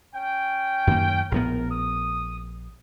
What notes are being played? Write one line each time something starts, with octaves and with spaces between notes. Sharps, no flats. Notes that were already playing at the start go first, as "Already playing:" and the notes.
C#4 G5
F#2 D#3 A#3
A#1 A2 B3 A#4
D#6